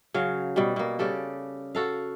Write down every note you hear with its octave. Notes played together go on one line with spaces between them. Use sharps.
C#3 F#3 F5
B2 G3
B2 A#3
C#3 G3 G4 A4
F#4 A4 F5